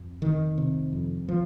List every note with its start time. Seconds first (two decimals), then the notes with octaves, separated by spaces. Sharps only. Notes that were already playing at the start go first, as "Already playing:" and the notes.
Already playing: F2
0.22 F1 D#3
0.58 C3
0.93 F2
1.29 F3